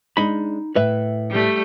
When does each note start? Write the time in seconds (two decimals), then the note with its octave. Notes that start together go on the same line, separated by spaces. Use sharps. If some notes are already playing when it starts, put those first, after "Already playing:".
0.17 G#3 D4 D#4 B5
0.76 A2 B4 E5
1.30 G3 A3